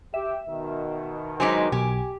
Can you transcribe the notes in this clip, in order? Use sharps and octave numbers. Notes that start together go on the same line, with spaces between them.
G4 E5
B2 D#3
F#3 G#3 D#4 C5 G#5 C6 D6 B6
B1 G4 G#5